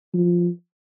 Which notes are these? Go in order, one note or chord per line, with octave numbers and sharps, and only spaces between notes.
F3